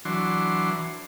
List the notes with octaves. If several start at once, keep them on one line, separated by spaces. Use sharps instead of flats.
E3 F#3 D4 C6